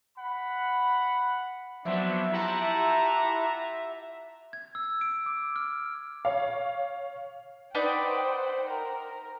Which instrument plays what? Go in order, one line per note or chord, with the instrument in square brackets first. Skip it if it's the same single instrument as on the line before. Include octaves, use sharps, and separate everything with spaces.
[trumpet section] F#5 B5
[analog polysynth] F3 F#3 B3 [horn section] C4 D4 [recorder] E5
[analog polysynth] E4 G4 F#5 [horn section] F4 A5 A#5
[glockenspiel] G#6
E6
D7
D6
F6
[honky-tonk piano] C#5 F5
[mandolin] D#4 B4 D5 [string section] C5 F#5 G5
[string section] A#4